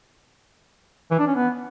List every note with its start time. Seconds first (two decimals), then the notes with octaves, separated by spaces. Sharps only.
1.11 E3
1.19 D4
1.27 C#4
1.36 B3